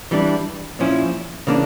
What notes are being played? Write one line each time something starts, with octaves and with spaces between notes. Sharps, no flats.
E3 G3 D4
A#2 F3 C#4 E4
C#3 E3 A#3 D4